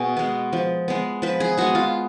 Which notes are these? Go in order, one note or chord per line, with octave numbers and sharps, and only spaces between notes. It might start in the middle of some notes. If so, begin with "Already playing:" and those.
Already playing: B2 F#4 G#4
G#3 B3
F3
G#3 B3
F3 B4
G#4
G#3 B3 F#4
F4